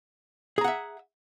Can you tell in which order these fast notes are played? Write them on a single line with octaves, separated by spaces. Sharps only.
G#4 A#5 F#5 E5